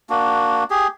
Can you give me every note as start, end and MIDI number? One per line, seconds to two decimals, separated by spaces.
0.10 0.64 58
0.10 0.64 62
0.10 0.64 66
0.70 0.87 67
0.70 0.87 68